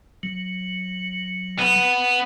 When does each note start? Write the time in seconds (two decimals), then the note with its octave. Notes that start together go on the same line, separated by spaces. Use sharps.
0.23 F#3
1.59 B3